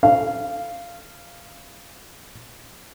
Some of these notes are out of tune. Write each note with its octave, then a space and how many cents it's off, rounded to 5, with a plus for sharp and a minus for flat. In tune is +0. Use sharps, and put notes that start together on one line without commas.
F5 -15